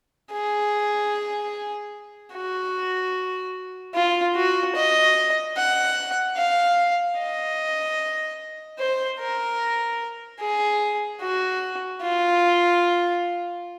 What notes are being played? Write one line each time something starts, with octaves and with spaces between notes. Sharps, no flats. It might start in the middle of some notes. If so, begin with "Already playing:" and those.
G#4
F#4
F4
F#4
D#5
F#5
F5
D#5
C5
A#4
G#4
F#4
F4